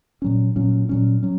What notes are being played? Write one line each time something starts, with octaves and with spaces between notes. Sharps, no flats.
A#2 F#3 C#4
A#2 F#3 C#4
A#2 F#3 C#4
F#3 C#4